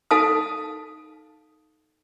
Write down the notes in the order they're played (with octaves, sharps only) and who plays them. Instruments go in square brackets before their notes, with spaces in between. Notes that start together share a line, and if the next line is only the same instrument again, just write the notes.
[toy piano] D#4 A4 F5 A5 D#6